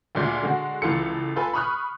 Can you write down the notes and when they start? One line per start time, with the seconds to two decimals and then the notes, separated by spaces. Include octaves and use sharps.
0.15 D2 A#2 G#3
0.43 D3 G#3 F#4
0.82 C#2 E3 F4 A4 C#7
1.36 F4 A4 B4 G#5
1.53 B5 C#6 D#6 F6 F#6